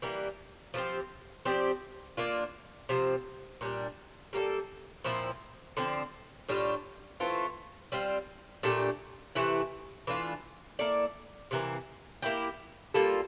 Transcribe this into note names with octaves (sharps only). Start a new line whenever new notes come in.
E3 G3 A#3
F3 A3 C4 G4
F3 C4 G4 D5
A#3 D4 F4
C3 F3 C4
A#2 G3 D4
G3 A#3 F4 A4
A#2 F3 C4 E4
D3 F3 C4
A2 G3 D4 F4
E3 A3 C4 F4
G3 C4 F4
A#2 A3 D4 G4
C3 E3 A3 E4
E3 A3 D4 F4
A#3 E4 A4 D5
C3 E3 A#3
A#3 E4 G4
G3 A#3 F4 A4